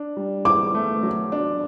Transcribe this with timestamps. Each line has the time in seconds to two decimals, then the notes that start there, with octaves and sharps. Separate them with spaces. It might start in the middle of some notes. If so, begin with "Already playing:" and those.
Already playing: D4
0.17 G3
0.45 E4 D6
0.74 A3
1.03 F#3
1.32 D4